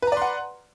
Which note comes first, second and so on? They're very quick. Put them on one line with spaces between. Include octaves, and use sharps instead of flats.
B4 A#5 D5 C6 F#5